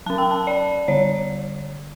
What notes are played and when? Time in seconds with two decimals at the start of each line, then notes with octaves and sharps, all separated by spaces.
0.06 F#3 C#4 A5
0.18 G5
0.31 A5
0.47 D5
0.88 D3 G3 C#5